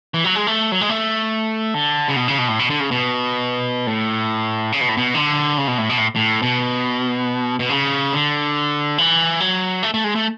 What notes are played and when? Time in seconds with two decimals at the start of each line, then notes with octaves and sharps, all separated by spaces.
0.14 E3
0.24 F#3
0.35 G#3
0.47 A3
0.72 F#3
0.81 G#3
0.89 A3
1.74 D3
2.09 C#3
2.16 B2
2.28 C#3
2.38 B2
2.48 A2
2.59 B2
2.70 D3
2.80 C#3
2.91 B2
3.87 A2
4.72 C#3
4.81 B2
4.89 A2
4.97 B2
5.14 D3
5.58 C#3
5.68 B2
5.78 A2
5.89 B2
5.98 A2
6.16 A2
6.42 B2
7.59 B2
7.69 C#3
8.13 D3
8.98 E3
9.40 F#3
9.83 A3
9.94 A3
10.04 G#3
10.15 A3